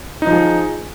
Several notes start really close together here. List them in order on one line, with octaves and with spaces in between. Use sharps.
D#4 F3 G#4